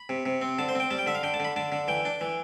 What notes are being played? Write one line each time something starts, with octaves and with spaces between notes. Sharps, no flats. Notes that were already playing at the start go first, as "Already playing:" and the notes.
Already playing: B5
C3
C3
C4
D3 A5
C5
C4 G5
G3 A5
G5
D3 E5
F5
D3 G5
A5
D3 B5
D3 A5
D3
E3 G5
D4
E3